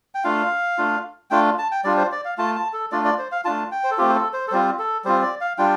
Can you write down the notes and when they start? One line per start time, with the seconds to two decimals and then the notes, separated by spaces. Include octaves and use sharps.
0.15 G5
0.24 A3 D4 F4 F5
0.78 A3 D4 F4
1.31 A3 D4 F4 G5
1.58 A5
1.72 G5
1.84 G3 D4 F4 D5
1.97 C5
2.12 D5
2.25 F5
2.38 A3 F4 A5
2.56 A5
2.73 A4
2.92 A3 D4 F4 D5
3.05 D5
3.19 C5
3.32 F5
3.45 A3 D4 F4 A5
3.71 G5
3.84 C5
3.91 A4
3.98 A3 C4 F4 G4
4.09 C5
4.16 A4
4.33 C5
4.48 A4
4.51 G3 C4 F4 C5
4.79 A4
5.05 G3 C4 F4 C5
5.22 D5
5.41 F5
5.58 G3 D4 F4 G5